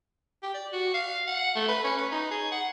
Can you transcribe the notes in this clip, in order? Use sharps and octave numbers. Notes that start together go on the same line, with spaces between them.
G4
D5
F#4
F5
F#5
A3
B4
C#4
B4
D#4
G#4
F#5